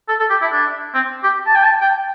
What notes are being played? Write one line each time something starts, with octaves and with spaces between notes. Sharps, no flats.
A4
A4
G4
E4
D4
C4
G4
A5
G5
A5
G5